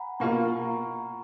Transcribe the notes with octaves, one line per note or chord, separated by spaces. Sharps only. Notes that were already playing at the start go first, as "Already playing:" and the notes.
Already playing: F#5 G#5 A#5 B5
B2 A#3 F4 A#5 C#6
A#5 C#6